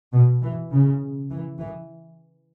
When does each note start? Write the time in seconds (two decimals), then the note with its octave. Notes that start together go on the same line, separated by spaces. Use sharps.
0.13 B2
0.42 E3
0.72 C#3
1.30 E3
1.60 E3